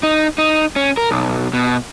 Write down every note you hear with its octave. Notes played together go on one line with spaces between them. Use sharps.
D#4
D#4
C#4
A#4
B1
B2